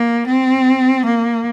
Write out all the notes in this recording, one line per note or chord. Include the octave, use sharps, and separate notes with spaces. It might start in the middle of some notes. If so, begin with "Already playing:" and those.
Already playing: A#3
C4
A#3